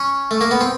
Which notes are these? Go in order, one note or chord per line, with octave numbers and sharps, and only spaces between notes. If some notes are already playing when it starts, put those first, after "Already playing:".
Already playing: C#4
A3
A#3
B3
C4